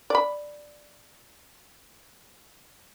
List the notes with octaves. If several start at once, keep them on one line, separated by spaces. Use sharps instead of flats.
D5 B5